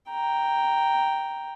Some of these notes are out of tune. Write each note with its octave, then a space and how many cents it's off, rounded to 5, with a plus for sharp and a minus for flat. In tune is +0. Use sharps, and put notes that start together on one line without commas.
G5 +0 A#5 +0